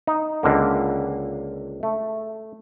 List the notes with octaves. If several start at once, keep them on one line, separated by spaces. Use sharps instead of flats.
D#4
C#2 D3 A#3
A3